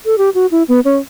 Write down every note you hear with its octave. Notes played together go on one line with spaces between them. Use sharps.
A4
G4
F#4
E4
B3
C#4